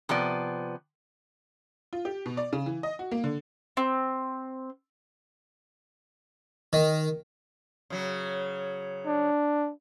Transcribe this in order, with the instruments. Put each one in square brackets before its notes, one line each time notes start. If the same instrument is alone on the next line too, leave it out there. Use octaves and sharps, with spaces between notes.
[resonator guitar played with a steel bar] C3 F3 B3 D5
[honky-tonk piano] F4
G4
B2
D5
C#3
E3
D#5
F#4
A#3
D3
[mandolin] C4
[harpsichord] D#3
[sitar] C#3 F#3
[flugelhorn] D4